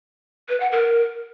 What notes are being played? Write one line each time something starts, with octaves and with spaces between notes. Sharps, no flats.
B4
F#5
A#4